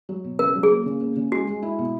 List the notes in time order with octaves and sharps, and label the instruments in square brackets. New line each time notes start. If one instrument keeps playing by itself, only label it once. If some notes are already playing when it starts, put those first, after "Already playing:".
[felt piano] F#3
B2
[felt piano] C#3 [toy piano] A#4
[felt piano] F#3
[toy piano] G#4
[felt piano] A#3
C#3
A#3
C#3
[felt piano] G#3 [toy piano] F#4
[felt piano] G#3
E4
B2